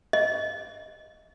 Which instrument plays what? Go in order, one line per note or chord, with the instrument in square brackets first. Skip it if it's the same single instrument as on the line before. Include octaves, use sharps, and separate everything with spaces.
[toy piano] D#5